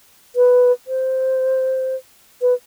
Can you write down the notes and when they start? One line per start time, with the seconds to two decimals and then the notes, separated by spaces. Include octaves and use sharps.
0.36 B4
0.87 C5
2.42 B4